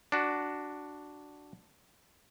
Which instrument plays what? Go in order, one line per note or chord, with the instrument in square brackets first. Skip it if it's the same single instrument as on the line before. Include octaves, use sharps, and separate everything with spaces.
[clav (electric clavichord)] D4 F#4